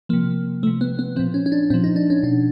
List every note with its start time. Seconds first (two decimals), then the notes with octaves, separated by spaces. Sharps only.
0.09 C3 F3 A#3
0.63 C3 F3 A3
0.81 B3
0.99 B3
1.16 F3 C4
1.19 A#2
1.34 C#4
1.46 C#4
1.52 D4
1.70 A#2 F3 C4
1.84 D#4
1.96 D4
2.10 C#4
2.23 B2 D4